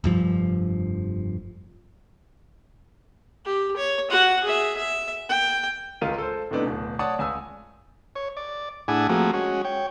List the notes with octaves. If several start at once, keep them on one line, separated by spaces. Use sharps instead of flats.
F1 G2 F3
G4
C#5
F#4 F#5
G#4 E5
E5
G5
C#2 G#3 F4 A#4 D#7
A4 C5
A2 C3 A3 B3 D4 D#4
D1 B2
C#5 D5 F#5 A5 D6 D#6
C#2 G#5 D#6 E6
C#5
D5
A2 D4 E4 G#4 F#5 G#5
F3 A3 A#3 C4 F#4 G#4
G#3 C#4 F#4
C#5 G5